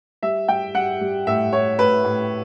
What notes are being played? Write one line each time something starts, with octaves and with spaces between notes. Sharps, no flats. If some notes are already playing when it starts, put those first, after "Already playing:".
G3 E5
G3 G5
G3 F#5
G3
A2 E5
A2 C#5
A2 B4
A2